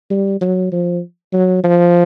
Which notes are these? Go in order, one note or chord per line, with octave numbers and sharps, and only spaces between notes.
G3
F#3
F3
F#3
F3